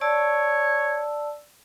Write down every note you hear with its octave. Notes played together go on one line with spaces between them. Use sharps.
C#5 D5 A5 E6